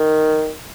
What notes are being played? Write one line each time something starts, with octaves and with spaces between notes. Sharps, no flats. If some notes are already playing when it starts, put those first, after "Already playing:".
Already playing: D#3